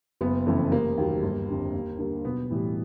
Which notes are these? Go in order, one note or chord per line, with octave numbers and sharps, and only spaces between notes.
F#1 B3
F2 C#3 E3 A3
F1 A#3
D#2 D#3 F#3
G1
F2 D3 G3
D#2
D3 G3 A#3
B1 B3
A2 E3 G3